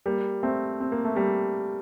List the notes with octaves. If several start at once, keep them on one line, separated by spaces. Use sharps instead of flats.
G3 A#3
A3 C4
C4
A#3
A3
G3 A#3